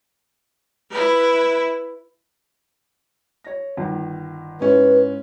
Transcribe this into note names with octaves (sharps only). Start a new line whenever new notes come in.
E4 B4
C#5 A#6
G1 D#3
G#2 C#4 E4 B4